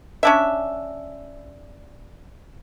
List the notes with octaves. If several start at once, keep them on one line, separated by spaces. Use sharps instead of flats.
C#4 D4 E5